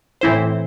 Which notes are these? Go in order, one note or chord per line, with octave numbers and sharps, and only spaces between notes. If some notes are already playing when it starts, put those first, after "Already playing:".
A2 E3 C4 E4 C5